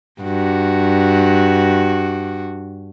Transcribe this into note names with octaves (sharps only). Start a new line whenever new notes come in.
G2 F#4